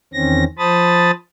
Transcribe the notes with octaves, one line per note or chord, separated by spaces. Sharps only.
E2 D#3 C4 C#4 A#6
F3 C5 A5 B5 D#6 A6